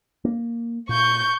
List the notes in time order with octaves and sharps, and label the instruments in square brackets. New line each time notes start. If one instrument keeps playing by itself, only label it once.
[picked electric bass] A#3
[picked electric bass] A#2 [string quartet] C#6 G6